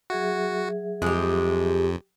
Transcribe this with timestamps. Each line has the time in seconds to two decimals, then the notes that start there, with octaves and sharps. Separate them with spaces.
0.10 F#3 F#4 G#4 E5
1.02 F2 G#3 G4